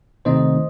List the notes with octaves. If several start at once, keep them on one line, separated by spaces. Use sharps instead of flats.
C3 D#3 A3 C4 D#4 C5 D#5